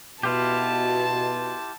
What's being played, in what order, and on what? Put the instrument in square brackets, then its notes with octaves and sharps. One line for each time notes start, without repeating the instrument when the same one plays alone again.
[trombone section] B2 [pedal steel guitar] E4 F4 G4 [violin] A5